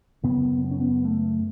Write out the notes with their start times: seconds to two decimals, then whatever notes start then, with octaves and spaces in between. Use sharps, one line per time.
0.23 F#2 C#3 B3
0.64 B3
0.71 C#4
0.80 B3
1.05 A3